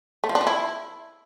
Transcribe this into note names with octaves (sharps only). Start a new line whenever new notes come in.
A3
F3
D4
F3
E4